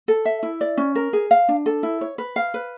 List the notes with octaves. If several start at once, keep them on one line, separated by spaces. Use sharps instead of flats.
A4
E5
E4
D5
C#4
A#4
G#4
F5
D4
A4
E4
C#5
B4
F5
B4